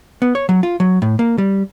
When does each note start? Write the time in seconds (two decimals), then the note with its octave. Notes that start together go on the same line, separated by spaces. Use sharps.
0.22 B3
0.35 C#5
0.49 F#3
0.63 F4
0.80 F#3
1.02 A2
1.19 A#3
1.38 G3